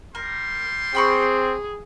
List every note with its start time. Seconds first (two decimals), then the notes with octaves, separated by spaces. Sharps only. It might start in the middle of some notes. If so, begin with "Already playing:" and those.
0.15 G3 A#4 C6
0.95 C4 G#4 G5 B5 C#6